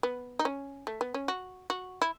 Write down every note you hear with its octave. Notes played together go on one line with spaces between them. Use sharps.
B3
D#4
C#4
A3
B3
C#4
F#4
F#4
E4